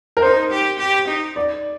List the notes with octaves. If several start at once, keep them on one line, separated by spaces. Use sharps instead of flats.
A#4
D#4 C5
G4
G4
D#4
D5